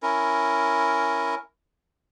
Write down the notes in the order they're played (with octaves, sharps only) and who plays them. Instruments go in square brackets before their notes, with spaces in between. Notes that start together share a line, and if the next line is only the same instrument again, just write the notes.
[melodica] C#4 E4 A#4